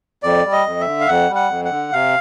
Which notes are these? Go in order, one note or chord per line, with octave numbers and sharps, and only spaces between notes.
F2 D5
G3
D#5
F2
E5
D3
F5
F2 F#5
G3
F#5
F2
F#5
D3
C3 F5